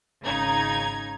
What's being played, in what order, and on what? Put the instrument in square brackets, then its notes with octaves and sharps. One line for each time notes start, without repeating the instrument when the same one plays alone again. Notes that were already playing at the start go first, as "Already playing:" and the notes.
[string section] G#1 C#3 D#4 G#6